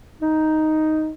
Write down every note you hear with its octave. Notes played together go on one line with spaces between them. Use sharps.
D#4